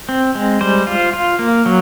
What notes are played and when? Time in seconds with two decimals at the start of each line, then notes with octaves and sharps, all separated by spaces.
0.09 C4
0.35 G#3
0.61 G3 C5
0.87 F4
1.13 F4
1.39 A#3
1.66 F#3